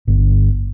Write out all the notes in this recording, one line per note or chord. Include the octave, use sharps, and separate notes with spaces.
G1